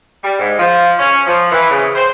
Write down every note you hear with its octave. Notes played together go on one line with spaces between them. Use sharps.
G3
G#2
F3
C#4
F3
E3
C#3
C5